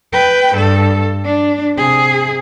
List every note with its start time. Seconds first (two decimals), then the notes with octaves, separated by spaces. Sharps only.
0.13 B4 G5
0.55 G2 A4
1.25 D4
1.77 C3 G#4